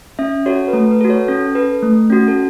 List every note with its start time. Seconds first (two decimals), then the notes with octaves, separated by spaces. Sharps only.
0.19 C#4 E5
0.46 F#4 A4 C#5
0.68 B4
0.73 A3 A4
0.91 B4
1.01 F#4 A4
1.10 C#5
1.28 C#4 A4
1.55 A4 B4
1.83 A3
2.10 C#4 F#4
2.28 A4